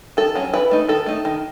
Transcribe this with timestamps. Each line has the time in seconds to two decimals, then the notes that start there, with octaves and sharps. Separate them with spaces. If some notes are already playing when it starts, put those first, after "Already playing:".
0.17 D#3 A4
0.35 F#3 C#4
0.54 E3 B4
0.71 A3 D#4
0.89 D#3 A4
1.06 A3 D#4
1.25 D#3